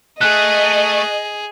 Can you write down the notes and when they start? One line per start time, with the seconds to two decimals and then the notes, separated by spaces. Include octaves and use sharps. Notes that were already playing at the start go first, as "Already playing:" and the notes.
0.21 A3 G#4 D#5 F#6